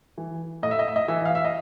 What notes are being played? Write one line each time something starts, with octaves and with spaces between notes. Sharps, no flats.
E3
A2 D#5
E5
D#5
E5
D#5
E3 E5
F5
E5
D#5